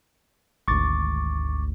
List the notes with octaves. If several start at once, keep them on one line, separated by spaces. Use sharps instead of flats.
G#1 D2 C#6 D6 A6